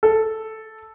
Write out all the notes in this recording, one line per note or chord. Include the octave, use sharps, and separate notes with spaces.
A4